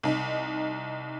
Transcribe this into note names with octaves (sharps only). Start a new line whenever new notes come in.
C2 D#4